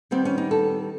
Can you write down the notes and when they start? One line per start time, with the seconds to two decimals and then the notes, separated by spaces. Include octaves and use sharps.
0.11 D#3 G3 B3 C4
0.25 C#4
0.38 D#4
0.51 A4